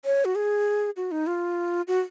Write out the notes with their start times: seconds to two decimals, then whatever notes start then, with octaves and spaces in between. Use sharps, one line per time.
0.05 C#5
0.25 F#4
0.35 G#4
0.97 F#4
1.12 D#4
1.27 F4
1.87 F#4